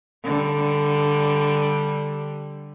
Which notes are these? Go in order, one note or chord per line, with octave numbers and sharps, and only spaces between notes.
D3 G3